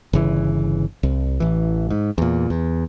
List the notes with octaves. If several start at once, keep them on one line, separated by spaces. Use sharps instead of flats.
G1 C#3 E3
C2
A1 E3
G#2
E2 A#2
E2